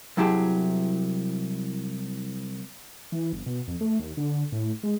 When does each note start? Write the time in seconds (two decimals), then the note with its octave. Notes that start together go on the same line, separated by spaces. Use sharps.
0.17 C2 F#3 E4 G4 G#4 A5
3.12 E3
3.33 G1
3.46 B2
3.68 F2
3.81 A3
4.00 D#2
4.17 D3
4.52 A2
4.83 G#3